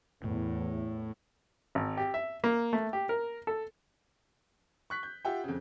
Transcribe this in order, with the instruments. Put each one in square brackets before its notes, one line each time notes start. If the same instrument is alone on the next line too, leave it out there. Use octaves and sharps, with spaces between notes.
[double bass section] E2 [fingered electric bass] A2
[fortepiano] G#1
G4
E5
A#3
A3
G4
A#4
A4
[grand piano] C#6 F#6 B6
G6
F4 G4 E5 F#5 G5
F2 C#3